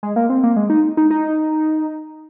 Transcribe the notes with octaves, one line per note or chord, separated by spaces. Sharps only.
G#3
A#3
C4
A#3
G#3
D#4
D#4
D#4